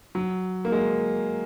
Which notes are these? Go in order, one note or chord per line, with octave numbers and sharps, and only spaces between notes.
F#3
A#3
G#3